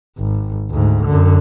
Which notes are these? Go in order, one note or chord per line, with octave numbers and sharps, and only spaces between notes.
G#1
D2 G#2
F#2 D3